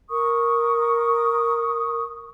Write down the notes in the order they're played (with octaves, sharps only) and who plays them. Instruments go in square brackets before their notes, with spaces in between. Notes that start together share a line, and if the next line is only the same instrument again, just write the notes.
[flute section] A#4 C#6 D#6